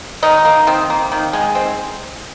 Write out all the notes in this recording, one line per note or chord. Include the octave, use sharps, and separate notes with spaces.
D#3 D#4
A#3
D#3 C4
A#3
D#3
G#3
C4